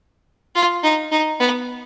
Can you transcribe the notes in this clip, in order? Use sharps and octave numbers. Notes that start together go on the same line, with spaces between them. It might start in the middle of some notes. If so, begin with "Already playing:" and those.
F4
D#4
D#4
B3